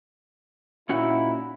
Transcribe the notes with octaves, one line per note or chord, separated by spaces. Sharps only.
A#2 C#4 D#4 E4 F#4 F#5